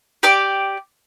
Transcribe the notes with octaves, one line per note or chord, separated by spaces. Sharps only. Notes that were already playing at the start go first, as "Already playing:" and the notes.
G4 D5 D6